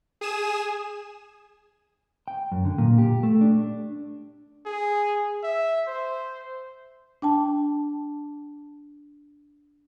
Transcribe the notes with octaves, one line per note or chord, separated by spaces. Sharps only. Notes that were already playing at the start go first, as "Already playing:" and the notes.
G#4 G#5 D#6 E7
G5
F#2
D3
A#2
G4
A3
D4
G#4
E5
C5
D4 G5 A5